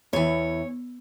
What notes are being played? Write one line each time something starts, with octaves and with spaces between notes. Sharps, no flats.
E2 E3 C#5